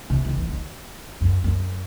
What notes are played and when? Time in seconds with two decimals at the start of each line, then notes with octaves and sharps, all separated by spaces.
0.10 C3
0.25 D#3
0.38 E3
0.49 D#3
1.21 F#2
1.44 F#2